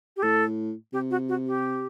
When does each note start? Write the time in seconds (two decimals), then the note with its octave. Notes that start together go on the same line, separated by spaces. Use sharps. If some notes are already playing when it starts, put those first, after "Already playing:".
0.17 G4
0.23 A2 A4
0.93 C3 G4
1.11 F#4
1.29 F#4
1.47 G4